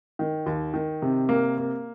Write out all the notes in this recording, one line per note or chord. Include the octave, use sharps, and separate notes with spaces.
D#3
D#2
D#3
C3
A#3
A#3